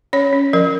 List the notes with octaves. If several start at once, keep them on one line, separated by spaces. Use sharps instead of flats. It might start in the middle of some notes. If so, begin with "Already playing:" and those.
C#4 C#5
C#4
F3 A#4